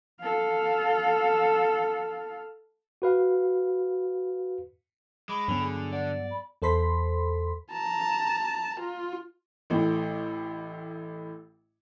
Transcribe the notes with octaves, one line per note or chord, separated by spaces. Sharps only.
A4 F5
F#4 B4 F5
G#3 B5 D6
G2 D3 F#3 B3 C#4
G#4
D5 F#5
B5
E2 A4 C5 B5 C6 B6
A5 A#5
F4
A1 A2